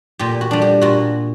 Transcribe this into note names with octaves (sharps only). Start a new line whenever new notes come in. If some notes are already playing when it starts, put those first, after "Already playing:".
A#2 G4
F#4
G3 D4
G4
A#2 F#4